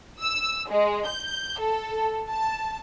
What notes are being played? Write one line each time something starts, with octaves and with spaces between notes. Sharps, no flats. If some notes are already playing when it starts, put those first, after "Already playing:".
E6
G#3
G6
A4
A5